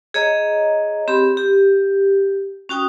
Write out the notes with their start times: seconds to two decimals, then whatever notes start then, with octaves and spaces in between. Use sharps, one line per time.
0.14 G#4 C#5 D#5 A#5
1.08 C4 G4 B5
1.37 G4
2.69 C#4 F#4 G5 D#6